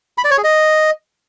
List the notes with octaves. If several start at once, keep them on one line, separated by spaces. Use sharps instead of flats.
B5
D5
C#5
G#4
D#5